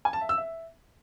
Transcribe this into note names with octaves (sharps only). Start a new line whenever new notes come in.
G#5
A5
E5
E6
E5